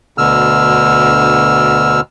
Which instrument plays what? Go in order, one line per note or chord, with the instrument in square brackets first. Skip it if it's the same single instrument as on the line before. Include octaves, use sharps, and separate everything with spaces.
[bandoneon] D2 B2 D3 E6 F6